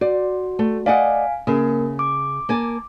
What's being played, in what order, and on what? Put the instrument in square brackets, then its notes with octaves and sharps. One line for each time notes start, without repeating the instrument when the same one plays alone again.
[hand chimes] F#4 [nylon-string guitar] D5
[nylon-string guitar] A3
[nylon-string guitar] D5 D#5 F#5 [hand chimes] F5 G#5
[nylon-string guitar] C#3 [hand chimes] A#3 A#4
[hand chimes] D6
[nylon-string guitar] A#3 G#5 A5